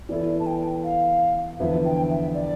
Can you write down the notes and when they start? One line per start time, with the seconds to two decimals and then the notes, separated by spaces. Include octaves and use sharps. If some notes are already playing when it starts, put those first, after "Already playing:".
0.09 E3 B3 E4 A4 D5
0.40 A5
0.47 G5
0.84 F5
1.60 E2 D3 F3 B3 E4 E5
1.85 G5
2.10 E5
2.34 D5